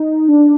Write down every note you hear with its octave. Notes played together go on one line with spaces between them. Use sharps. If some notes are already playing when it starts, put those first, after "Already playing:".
Already playing: D#4
D4